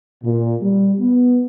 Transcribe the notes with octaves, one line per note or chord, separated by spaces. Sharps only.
A#2
G3
B3